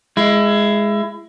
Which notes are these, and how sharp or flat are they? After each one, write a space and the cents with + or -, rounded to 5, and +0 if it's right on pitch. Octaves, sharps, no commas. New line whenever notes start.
G#3 +0 E4 +25